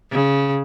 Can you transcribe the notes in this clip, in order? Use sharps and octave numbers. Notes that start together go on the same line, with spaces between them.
C#3